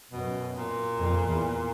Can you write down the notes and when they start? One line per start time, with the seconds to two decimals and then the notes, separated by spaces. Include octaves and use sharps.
0.12 F#2 B2
0.55 A#2
0.98 F2
1.26 E2